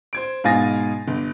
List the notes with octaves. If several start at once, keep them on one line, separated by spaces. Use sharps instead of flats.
C5 G#6 D7
G#2 B2 F5 G#5 A6 A#6
G1